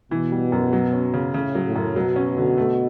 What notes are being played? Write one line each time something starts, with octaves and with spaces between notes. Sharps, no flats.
B2 E3
G3
F#2
F#3
C#4
C#3
A2 C#3
F#3
A2
F#2
B2 F#3
C#4
D3
A3